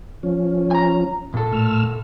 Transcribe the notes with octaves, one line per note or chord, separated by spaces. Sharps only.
F3 C#4
G#5 A#5
A#2 A4
A2 E6 F6